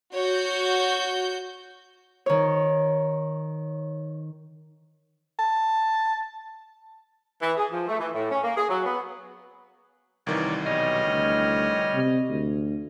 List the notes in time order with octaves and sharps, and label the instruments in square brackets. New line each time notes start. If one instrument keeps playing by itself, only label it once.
[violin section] F#4 G6 [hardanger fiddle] C#5
[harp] D#3 C#5
[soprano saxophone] A5
[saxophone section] E3
G#4
F3
A3
E3
A2
C#4
A#3
G#4
F#3
B3
[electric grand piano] C2 D#3 E3 [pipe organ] A#4 C#5 D5
[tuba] B1 [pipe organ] G3 C#5 F6 [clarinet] D#5
[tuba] D2
C3
D2